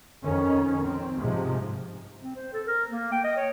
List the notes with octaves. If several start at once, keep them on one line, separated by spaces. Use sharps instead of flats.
F2 D#3 C#4
C4
G#2 C3 F3
C4
C5
A4
A#4
A#3
G5
D#5
C#5